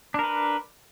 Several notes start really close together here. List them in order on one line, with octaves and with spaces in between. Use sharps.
D4 A#4 B4